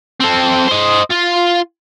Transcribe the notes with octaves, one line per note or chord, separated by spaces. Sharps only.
C4 A4
C5 D#5
F4